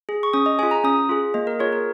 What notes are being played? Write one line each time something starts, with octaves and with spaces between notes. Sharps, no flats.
G#4
C#6
C#4 D#6
D#5
F4 G#4 G#5
A#5
C#4 D#6
F4 G#4
A#3 D#5
A#4
F4 G#4 C#5
A#4